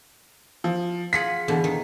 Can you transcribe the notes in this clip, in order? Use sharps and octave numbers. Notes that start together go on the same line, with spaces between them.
F3
F4 G#4 F#5 B6
E2 B2 D3
D#3